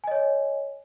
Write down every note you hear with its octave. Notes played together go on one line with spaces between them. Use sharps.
C#5 D#5 G#5